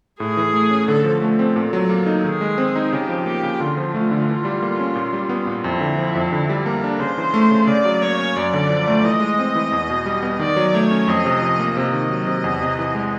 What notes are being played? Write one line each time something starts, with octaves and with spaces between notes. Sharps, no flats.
A2 G#4
E3
A3
C#4
D3 A4
F3
A3 A4
C4
A#2
F#3
A#3
D#4
D#3 G#4
G#3
C4
D#4
C#3 G4
F3
A#3 G4
C#3
D3 F4
F3
A3
D3
E3
G3
A#3
C#4
A#2
G3
B3
A#2
F2 E4
D3
F3
F2
D3 E4
G3
A#3 A#4
D4
C#3 C5
E3
A3
C#3
C#3 D5
F#3
A#3 C#5
C#4
F#2 D5
D3
F3
A3
E3 D#5
G#3
C4
E3
E2
B2
G3
B3
D#3 D5
F#3
A3 C#5
C#4
F2 D#5
C3
F3
A#3
C3 D#5
D#3
F#3
C3
E2
C3
E3
G#3